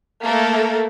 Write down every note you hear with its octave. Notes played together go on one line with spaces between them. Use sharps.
A3 A#3 A4 A#4